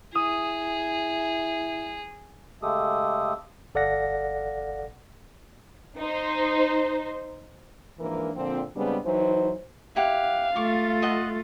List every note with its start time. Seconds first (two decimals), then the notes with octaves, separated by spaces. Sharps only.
0.15 E4 G#4 D#6
2.62 C#3 G#3 A3 G4 A4 D#6
3.75 G1 A4 D5 F5 F#5 A#6
5.99 D#4 C5
8.00 G#2 E3 F3 A#3 D4 A#4
8.35 A#2 D3 F3 C4
8.75 C#3 G3 G#3 B3 C4 D4
9.04 E3 F#3 D#4 C5
9.96 E4 G4 F5 F#5
10.56 A3 F4 C#6 D6
11.02 A4 D#5 F#5